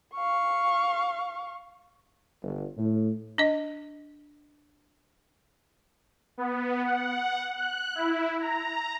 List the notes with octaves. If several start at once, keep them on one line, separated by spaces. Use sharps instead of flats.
F5 C#6
G1
A2
D4 D#5
B3
F#5
F#6
E4
A#5